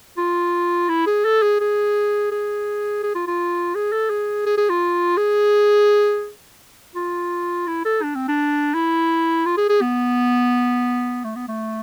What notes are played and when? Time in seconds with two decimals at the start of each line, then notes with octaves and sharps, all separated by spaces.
0.17 F4
0.89 E4
1.06 G#4
1.25 A4
1.42 G#4
1.60 G#4
2.32 G#4
3.03 G#4
3.15 F4
3.27 F4
3.75 G#4
3.92 A4
4.10 G#4
4.46 G#4
4.57 G#4
4.70 F4
5.17 G#4
6.95 F4
7.67 E4
7.85 A4
8.03 D4
8.15 C4
8.28 D4
8.74 E4
9.46 F4
9.57 G#4
9.69 G#4
9.81 B3
11.24 A3
11.35 B3
11.48 A3